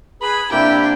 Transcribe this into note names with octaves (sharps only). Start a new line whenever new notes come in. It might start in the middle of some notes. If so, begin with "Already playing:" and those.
G#4 B4 B5
C3 A#3 D4 E4 G4 G5